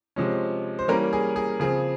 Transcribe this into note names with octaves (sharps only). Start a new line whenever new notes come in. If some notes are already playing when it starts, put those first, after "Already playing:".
C3 F3 G#3 C#4
C5
E3 G3 A#3 C#4 A#4
G#4
G#4
C#3 F3 C4 G#4